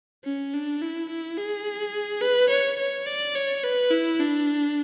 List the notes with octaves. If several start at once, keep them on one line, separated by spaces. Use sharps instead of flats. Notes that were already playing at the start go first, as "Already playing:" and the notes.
C#4
D4
E4
E4
G#4
B4
C#5
C#5
D5
C#5
B4
E4
D4